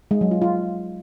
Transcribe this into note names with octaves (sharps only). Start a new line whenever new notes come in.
G#3
F#3
F4
F4